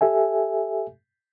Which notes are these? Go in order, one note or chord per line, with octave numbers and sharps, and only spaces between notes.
G4 A4 E5 G#5